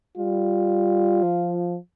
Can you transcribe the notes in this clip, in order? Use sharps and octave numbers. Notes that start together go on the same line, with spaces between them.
G3 F4
F3